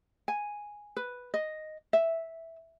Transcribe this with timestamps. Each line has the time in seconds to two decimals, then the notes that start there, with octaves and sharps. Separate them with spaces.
0.28 G#5
0.96 B4
1.34 D#5
1.93 E5